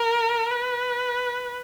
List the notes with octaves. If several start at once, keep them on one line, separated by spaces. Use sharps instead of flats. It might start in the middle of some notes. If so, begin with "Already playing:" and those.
Already playing: A#4
B4